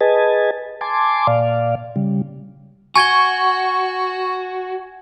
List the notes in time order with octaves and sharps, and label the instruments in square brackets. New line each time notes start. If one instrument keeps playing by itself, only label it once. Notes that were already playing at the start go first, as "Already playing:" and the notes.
[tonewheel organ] G#4 B4 D#5 G#5 A5
G#5 A5 C6 D6
A#2 D5 F5
C#3 G3
[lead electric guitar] F#4 [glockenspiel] G#5 G#6 G7 [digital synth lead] C#6